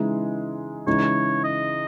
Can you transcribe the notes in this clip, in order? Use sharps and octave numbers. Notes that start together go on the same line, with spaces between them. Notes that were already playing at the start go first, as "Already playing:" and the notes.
Already playing: C#3 E3 G#3 D#4
C#3 E3 G#3 D#4 C#5
D#5